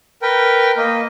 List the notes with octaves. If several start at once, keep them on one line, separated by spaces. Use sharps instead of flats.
A#4 B4 G5
A#3 D#5